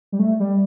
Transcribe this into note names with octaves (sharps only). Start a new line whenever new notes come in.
G3
A3
G3